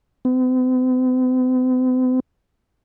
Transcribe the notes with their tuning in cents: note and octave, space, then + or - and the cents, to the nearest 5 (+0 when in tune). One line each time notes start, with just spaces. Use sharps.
C4 -45